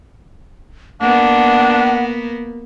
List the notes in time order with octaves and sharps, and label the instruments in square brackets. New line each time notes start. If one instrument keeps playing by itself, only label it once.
[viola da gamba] A#3 B3 [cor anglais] D4 [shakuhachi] F#5